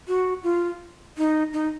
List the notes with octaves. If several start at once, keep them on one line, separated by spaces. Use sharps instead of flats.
F#4
F4
D#4
D#4